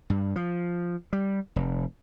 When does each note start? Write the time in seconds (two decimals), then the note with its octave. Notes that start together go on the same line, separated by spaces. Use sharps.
0.10 G2
0.36 F3
1.13 G3
1.56 F1